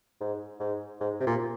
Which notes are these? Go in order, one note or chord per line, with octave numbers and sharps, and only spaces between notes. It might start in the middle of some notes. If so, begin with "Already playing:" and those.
G#2
G#2
G#2
C3
A#2